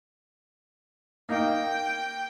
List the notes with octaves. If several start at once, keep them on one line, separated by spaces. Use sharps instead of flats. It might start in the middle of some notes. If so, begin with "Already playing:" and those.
A#3 D#4 F5 G5